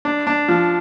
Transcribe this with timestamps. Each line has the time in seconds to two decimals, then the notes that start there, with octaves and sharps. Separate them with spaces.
0.05 D4
0.27 D4
0.48 F3